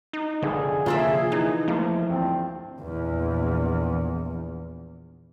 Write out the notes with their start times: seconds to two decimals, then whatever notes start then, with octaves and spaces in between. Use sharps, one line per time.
0.13 D#4
0.42 F1 F2 D3 G#4
0.86 C3 F3 A#3 F4 D5 E5
1.32 E3 D#4
1.68 F3 A3 A#3
2.10 D2 G2 C4
2.81 A#1 E2